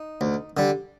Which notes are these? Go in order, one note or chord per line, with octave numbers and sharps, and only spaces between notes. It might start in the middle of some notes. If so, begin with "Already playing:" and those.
Already playing: D#4
D2
D3 G3